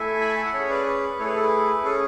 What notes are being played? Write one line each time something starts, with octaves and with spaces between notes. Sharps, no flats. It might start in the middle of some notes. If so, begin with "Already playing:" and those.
Already playing: A3 E4 A4 E5 G#5
B5
A5
G#5
F#5
C#4 G#4 C#5 E5
B4 D5
B4
A3 E4 G#4 A4 C#5
B4
A4
B4
C#4 G#4 A4